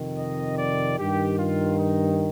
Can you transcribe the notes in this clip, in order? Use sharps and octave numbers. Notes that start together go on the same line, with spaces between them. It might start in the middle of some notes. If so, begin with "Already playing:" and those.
Already playing: F2 C3 D#3
D#5
D5
G2 D#3 G4
F4
D#4